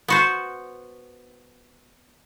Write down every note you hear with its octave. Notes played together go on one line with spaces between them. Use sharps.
B3 F#4 C5